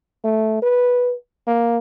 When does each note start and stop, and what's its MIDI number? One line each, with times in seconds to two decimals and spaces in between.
0.24 0.59 57
0.62 1.14 71
1.47 1.78 58